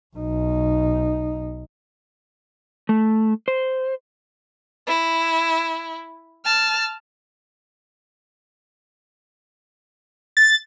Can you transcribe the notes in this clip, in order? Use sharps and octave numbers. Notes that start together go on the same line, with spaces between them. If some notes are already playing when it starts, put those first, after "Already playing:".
B1 D#4
A3
C5
E4
A5 F6
A6